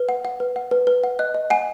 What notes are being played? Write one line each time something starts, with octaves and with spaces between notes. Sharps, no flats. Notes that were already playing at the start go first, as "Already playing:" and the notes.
Already playing: B4
F#5
F#5
B4
F#5
B4
B4
F#5
D#5 F#6
D#5
F#5 G#5